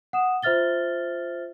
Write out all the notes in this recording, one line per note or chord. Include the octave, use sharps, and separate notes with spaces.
F#5 D#6 E7
F4 C5 E5 F6 A6 G7